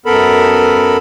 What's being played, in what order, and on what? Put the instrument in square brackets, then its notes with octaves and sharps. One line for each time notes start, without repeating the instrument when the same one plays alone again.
[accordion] F#2 B3 A4 A#4 B5